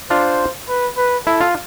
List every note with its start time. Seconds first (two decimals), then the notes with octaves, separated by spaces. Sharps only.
0.10 D4 F4 C5
0.68 B4
0.97 B4
1.26 E4 A4
1.40 F4